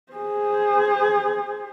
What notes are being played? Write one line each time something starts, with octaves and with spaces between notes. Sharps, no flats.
G#4 C5